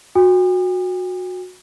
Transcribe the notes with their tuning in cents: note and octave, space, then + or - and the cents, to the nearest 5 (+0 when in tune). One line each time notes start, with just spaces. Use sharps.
F#4 -20 G5 +45 D#6 -40